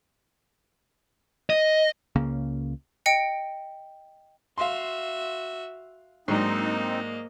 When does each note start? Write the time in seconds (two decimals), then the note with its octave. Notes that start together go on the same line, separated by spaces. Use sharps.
1.50 D#5
2.16 C#2 C#3 A#3 C#4
3.06 D#5 G5 C#7 D7
4.58 F#4 E5 F5 C6
6.28 G#2 F#3 A#3 C4 D4 D#4 D#5